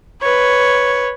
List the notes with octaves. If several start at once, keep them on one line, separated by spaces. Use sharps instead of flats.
B4 C#5